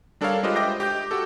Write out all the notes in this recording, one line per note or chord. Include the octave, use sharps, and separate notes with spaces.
G3 D4 A4 A#4 C#5 F5
G#3 F4 G4 B4 C5 D#5
D#5 E5 G5 D6 G6 A#6
G4 D6 G6
F#4 G4 A4